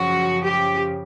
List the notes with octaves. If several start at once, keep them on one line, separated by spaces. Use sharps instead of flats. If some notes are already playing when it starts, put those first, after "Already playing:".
Already playing: F#2 C#3 F3 F#4
G4